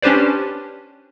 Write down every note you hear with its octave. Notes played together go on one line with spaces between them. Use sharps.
C#4 D4 G4 B4 C5 D5